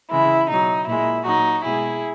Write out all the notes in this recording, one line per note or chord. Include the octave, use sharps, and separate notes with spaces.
C#3 E3 G#3 E4
B2 F#3 D#4
A#2 G#3 E4
A#2 F#3 D#4 F#4
B2 G#3 E4 G#4